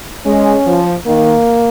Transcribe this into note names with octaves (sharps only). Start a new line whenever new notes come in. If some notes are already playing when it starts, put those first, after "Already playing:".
G#3 C#4
F3
D#3 A#3